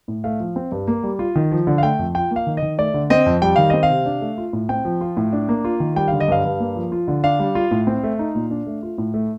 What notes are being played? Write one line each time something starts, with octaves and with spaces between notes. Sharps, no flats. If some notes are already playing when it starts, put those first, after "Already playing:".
A2
A3 F5
F3
C4
G2
A#3
G3
F4
D#3
F3
D3
F5
A3 G5
F2
F4 G5
A#3
F5
D#3
D#5
D#3
A3 D5
D3
C4 D#5
F2
G3 G5
D#3 F5
C4 D#5
F5
C3
D4
A3
F4
A2
C4 G5
F3
F4
A2
D4
A#3
F4
D#3
G3 G5
D3 F5
D#5
G2 F5
G2
A#3
F3
F4
D3
D4 F5
G3
F4
A2
C4
A3
D#4
A#2
D4
A3
F4
A2
A3